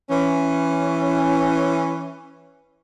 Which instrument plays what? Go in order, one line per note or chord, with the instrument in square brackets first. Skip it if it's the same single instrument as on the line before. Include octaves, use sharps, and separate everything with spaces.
[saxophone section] E3 C#4